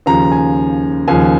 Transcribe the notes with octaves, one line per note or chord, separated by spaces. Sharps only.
D#2 C#3 F3 A#5
G#5
D#2 C#3 F3 G#5